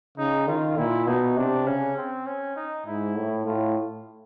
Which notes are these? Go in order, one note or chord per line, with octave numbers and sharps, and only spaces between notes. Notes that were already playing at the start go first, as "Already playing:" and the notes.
C#3 D#4
D#3 F4
A#2 E4
B2 D#4
C3 D4
C#3 C#4
C4
C#4
D#4
G#2 E4
A2
A2 F4